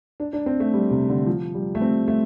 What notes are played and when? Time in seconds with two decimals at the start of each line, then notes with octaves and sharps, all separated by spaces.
0.20 D4
0.33 D4
0.46 C4
0.60 A3
0.74 G3
0.91 C3
1.09 D3
1.27 F3
1.54 G3
1.75 A3
1.81 C4
2.08 A3